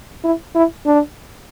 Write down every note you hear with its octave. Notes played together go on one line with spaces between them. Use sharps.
E4
E4
D4